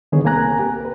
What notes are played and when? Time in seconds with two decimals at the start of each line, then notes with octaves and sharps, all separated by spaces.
0.12 D3 D#3 G3 B3 G#4 C#5
0.24 C2 A#3 C4 G#5 A#5 F#6
0.59 G4 A#4
0.81 A#4 B4